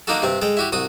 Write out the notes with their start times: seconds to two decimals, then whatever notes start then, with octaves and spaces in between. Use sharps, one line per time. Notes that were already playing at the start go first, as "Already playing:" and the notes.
0.07 A#3 D4 D#4 F#4 A4
0.22 G2 C3 C4
0.42 G#3 A4 G5
0.57 E4 F#4 G4
0.72 C2 F#4 D#6